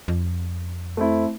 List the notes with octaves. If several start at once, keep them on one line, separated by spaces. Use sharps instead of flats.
F2
A3 C4 E4